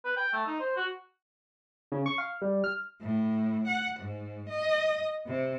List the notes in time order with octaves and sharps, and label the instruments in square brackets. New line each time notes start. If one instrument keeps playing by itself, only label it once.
[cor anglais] B4
G5
A3
D#4
C5
F#4
[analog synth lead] C#3
C#6
F5
G3
F6
[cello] A2
F#5
G#2
D#5
C3